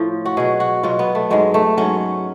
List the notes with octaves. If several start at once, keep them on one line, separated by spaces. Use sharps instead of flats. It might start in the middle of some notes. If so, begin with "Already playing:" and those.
Already playing: A2 F3
F#4
B2 F#3 G#4
F#4
B2 F#3 F4
B3
A3
G#2 F#3 G#3
A3
G#2 F#3 C#4